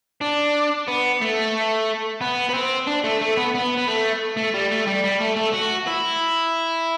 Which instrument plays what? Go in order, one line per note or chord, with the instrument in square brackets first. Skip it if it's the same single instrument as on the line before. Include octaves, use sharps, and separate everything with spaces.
[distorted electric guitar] D4
B3
A3
B3
B3
C4
D4
A3
A3
B3
B3
B3
A3
A3
G3
A3
G3
G3
A3
A3
F#4
E4